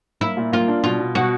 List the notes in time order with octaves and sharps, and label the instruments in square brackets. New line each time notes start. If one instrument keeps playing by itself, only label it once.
[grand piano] A#3 [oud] E4
[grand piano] A#2
[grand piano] A#3 [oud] F4
[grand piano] D4
[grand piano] B2 [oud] F4
[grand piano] B2
[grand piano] B2 [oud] F#4